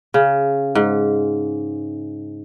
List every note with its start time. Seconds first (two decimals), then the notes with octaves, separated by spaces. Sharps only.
0.14 C#3
0.75 G#2